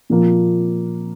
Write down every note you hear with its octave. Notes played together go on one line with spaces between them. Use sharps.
A#2 F3 A#3